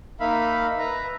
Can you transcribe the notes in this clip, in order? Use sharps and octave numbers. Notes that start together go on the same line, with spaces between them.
A#3 D#4 E5 F5 B5
B4 E5 A#5